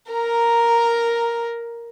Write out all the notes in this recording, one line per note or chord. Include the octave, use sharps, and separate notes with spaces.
A#4 A#5